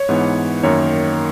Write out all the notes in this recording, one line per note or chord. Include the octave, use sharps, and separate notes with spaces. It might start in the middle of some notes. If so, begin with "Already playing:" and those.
Already playing: C#5
G#2 E3 B3
F#2 D#3 A#3 C#5